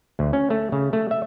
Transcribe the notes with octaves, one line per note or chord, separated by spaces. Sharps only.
D2
C#4
A3
C#3
A3
E5